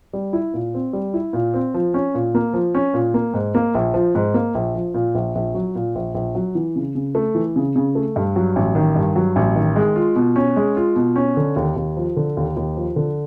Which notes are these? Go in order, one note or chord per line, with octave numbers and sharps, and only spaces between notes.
G3
E4
A#2
C4
G3
E4
A#2
C4
F3
C#4
A#2
A#3
F3
C#4
A#2
A#3
G#2
A#3
A#1
F3
G#2
A#3
A#1
F3
A#2
A#1
A#1
F#3
A#2
A#1
A#1
F#3
E3
C#3
C#3
A3
E3
C#3
C#3
A3
G2
F#3
A1
D#3
G2
F#3
A1
D#3
G#3
F4
B2
C#4
G#3
F4
B2
C#4
D3
D#2
D#2
F3
D3
D#2
D#2
F3
D3